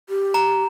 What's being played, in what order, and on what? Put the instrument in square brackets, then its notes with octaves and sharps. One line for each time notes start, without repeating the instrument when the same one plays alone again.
[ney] G4
[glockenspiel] A#5